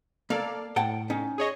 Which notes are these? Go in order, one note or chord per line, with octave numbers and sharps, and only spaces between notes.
A#3 A4 D5 F5
A2 F#5 G5 A5
C#4 D#4
G#4 C#5 D#5